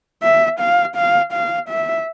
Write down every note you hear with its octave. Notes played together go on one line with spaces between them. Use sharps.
E5
F5
F5
F5
E5